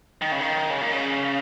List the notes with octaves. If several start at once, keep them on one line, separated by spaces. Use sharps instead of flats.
D#3
C#3
D#3
C#3
A#2
C#3